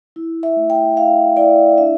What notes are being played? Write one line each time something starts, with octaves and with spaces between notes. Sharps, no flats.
E4
E5
A3
G5
E4 F5
E4 D5
D4 E5